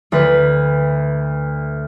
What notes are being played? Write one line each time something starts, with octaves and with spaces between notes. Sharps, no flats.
D2 B4